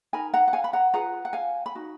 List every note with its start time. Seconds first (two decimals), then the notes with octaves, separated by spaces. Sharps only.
0.13 D#4 A#4 G#5 B5
0.34 F#5 A#5
0.48 F#5
0.53 F5 G#5
0.64 B5
0.73 F#5 A#5
0.94 F4 G#4 B4 F#5 A#5
1.25 F#5
1.33 F5 G#5
1.66 B5
1.75 D#4 F#4